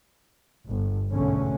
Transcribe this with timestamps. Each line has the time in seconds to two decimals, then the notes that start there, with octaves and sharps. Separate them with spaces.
0.66 G1
1.11 B1 G#2 B2 D3 A3 C#4